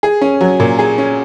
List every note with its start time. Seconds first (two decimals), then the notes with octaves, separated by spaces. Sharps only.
0.03 G#4
0.21 C#4
0.41 F#3
0.60 A#2
0.79 G#4
0.98 C#4